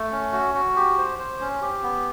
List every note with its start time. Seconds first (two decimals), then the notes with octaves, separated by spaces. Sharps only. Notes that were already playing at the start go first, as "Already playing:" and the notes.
Already playing: A3
0.12 C#4
0.32 F#4
0.54 F#4
0.76 G4
0.98 C5
1.19 C5
1.40 C#4
1.62 G4
1.83 B3